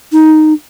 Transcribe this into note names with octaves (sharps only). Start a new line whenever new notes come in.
D#4